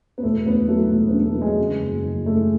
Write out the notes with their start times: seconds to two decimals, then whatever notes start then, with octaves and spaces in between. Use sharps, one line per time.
0.18 B3
0.23 E1 A3
0.45 D2 B3
0.68 F#3 A3
0.91 E1 A3
1.08 B3
1.13 D3
1.24 A3
1.36 F#3
1.42 G#3
1.58 C#3
1.80 F#1
2.04 F#1
2.26 E3 A3